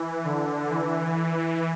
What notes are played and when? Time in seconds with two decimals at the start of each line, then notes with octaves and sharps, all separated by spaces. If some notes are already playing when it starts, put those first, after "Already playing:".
Already playing: E3
0.24 D3
0.70 E3